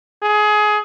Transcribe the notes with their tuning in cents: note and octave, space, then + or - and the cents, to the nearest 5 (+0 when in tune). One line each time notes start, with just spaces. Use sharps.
G#4 +20